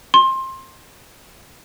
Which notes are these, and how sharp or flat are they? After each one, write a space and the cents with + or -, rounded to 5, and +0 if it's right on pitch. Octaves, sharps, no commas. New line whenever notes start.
C6 +20